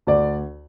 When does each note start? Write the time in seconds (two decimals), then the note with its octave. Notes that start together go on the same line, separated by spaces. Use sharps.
0.07 D2 D5